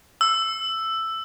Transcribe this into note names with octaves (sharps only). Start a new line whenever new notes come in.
E6